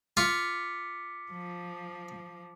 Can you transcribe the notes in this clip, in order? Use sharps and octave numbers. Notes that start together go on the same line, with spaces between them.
F4 D6 B6 C#7
F3